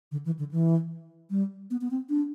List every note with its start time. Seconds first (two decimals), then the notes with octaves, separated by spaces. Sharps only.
0.12 D3
0.26 E3
0.39 D3
0.51 E3
1.30 G3
1.71 B3
1.81 B3
1.91 C4
2.09 D4